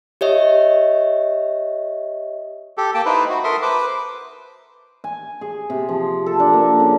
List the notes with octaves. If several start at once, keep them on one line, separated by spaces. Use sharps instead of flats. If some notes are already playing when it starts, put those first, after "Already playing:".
G4 C#5 D#5 E5
G4 A4
A#3 G5 A5
D#4 E4 B4 C5
F#4
A4 A#4 E5 C6 D#6
B4 C5 D6
G#5
G#4
C3
F3
A4
D4
A#3
C#3